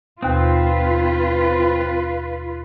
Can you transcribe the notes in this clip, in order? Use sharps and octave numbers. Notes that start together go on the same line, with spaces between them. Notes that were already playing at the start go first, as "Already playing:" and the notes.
D#2 B2 C4 F4 B4